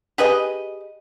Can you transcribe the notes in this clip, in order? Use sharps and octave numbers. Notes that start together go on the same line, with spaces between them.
G4 G#4 B4 D#5